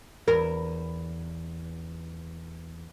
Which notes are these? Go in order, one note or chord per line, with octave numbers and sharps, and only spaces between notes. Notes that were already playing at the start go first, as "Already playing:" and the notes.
E2 A#4